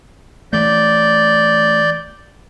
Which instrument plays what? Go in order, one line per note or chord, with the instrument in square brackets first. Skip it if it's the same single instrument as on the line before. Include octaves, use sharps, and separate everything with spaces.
[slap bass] E3 A3 [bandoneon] D5 G6